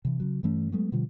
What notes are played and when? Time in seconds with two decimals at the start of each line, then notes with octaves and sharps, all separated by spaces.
0.05 C3 E3
0.20 C#3 F#3
0.43 G2 E3 A3 C#4
0.72 F#3 G#3 A3 B3
0.92 B2 D3 F3 G3